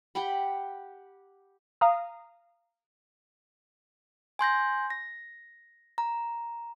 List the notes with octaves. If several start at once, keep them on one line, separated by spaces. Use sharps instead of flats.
G4 F#5 G5 B5
F5 A#5 D#6
G#5 C6 G6 A#6
A#6
A#5